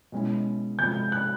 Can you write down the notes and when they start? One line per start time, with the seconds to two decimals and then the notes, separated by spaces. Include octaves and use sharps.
0.12 B2 G#3 C#4 E4
0.78 C3 F3 G#3 G6
1.12 F#6